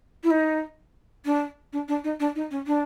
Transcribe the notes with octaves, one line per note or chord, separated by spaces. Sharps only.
E4
D#4
D4
D4
D4
D#4
D4
D#4
C#4
D4